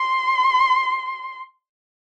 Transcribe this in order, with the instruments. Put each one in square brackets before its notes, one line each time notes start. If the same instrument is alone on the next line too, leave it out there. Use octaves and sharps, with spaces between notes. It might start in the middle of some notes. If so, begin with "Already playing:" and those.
Already playing: [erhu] C6